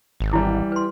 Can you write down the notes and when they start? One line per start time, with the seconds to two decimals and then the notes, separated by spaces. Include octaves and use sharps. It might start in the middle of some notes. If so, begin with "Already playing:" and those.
0.20 G#1
0.33 E3 G3 E4
0.72 B4 C6